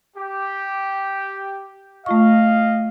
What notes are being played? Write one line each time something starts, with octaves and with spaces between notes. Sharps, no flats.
G4
A3 F4 D#5 F5 C#6